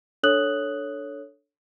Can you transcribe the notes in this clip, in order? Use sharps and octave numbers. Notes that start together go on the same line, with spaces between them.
D4 A4 C#5 D#6 F#6 F#7